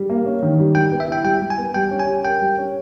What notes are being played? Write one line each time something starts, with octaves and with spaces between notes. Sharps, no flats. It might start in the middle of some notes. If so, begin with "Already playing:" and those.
Already playing: G3
A#3
C#4
D#3
G3
G3 G5
B3
E5
E4 G5
G3 G5
G3
G#5
B3
G3 G5
C#4
G#5
G4
A#4 G5
G3
C#4